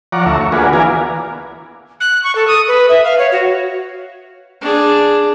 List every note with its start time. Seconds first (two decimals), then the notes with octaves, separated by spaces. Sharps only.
0.12 F3 C#5 D5 F#5 A#5
0.26 D2 A3 C#5 E5 A#5
0.39 C#5
0.52 A#3 D4 F4 F#4 G#4 B4
0.73 E3 B3 D5 F5 G#5 A#5
2.00 F#6
2.24 C#6
2.35 A4
2.48 D#6
2.68 B4
2.89 E5
3.04 F5
3.19 C#5
3.32 F#4
4.62 D4 G#4